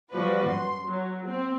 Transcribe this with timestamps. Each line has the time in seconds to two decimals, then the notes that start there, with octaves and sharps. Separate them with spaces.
0.12 F3 G3 F#4 B4 D5
0.48 F#2 C6
0.86 F#3
1.26 C4